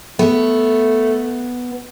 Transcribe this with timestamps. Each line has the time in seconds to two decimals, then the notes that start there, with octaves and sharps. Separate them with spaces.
0.19 A3 B3